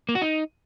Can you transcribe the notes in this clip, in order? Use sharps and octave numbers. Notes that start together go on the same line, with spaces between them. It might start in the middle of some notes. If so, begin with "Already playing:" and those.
A#3
F#4
D#4